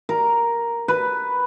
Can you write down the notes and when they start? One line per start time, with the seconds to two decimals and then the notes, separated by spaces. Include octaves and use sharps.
0.09 A#4
0.88 B4